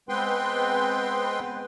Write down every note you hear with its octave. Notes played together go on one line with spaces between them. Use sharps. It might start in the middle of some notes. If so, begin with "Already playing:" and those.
G#3 B3 C4 B4 G5 C6